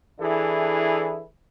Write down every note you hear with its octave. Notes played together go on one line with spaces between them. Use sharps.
E3 D4 E4 G#4 A4